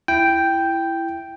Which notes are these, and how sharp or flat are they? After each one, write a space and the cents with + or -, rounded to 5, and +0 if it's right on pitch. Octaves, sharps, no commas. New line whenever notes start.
E4 +15 G5 +0